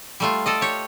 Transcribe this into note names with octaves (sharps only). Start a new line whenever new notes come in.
G3 A3 F4
A4 D5 D#5
G4 C#5